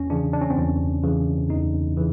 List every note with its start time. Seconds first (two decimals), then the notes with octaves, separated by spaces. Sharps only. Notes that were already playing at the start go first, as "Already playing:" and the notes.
Already playing: E2 C#4
0.10 C#3 E3 D4
0.33 D4
0.41 C#4
0.50 C4
0.57 E2 C#4
1.03 C#3 E3
1.49 E2 D#4
1.97 C#3 E3